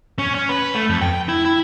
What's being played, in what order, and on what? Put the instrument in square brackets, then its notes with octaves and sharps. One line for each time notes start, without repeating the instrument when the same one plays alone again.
[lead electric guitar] C#4
C#4
B4
A3
F2
G5
E4
E4